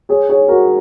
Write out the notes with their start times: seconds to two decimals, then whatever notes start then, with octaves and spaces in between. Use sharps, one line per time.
0.09 G#4 C#5
0.29 G#4 C#5
0.48 F#4 A#4